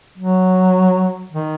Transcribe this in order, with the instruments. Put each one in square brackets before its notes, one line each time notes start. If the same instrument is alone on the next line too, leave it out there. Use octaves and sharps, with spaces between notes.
[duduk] F#3
D#3